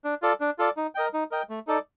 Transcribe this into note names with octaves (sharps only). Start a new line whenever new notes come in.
D4
F4 A4 D5
D4
F4 A4 D5
D#4
A#4 D#5 G5
D#4
A#4 D#5 G5
A3
D#4 A4 D5